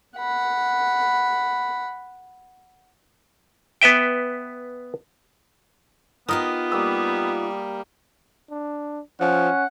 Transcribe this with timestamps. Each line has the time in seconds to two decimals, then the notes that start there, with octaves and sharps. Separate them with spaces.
0.17 F#5 B5
3.82 B3 B4 E5 G5
6.28 B3 D#4 F4 G4 A#4 D#5
6.72 G3 A#3 D#6 E6
8.51 D4
9.21 F3 C#4 F#5